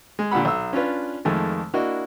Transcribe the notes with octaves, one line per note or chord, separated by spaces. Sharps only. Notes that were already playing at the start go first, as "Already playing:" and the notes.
G#3
A#2 D3 G4 F#5 B5
B1 E6
C#4 D4 F4 B4
F2 D#3 G#3 A3
A#3 D4 E4 F#4 D#5